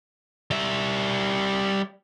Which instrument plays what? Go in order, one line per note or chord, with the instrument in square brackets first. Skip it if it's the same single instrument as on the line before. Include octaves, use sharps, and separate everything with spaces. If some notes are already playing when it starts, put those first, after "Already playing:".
[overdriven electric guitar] G3 E5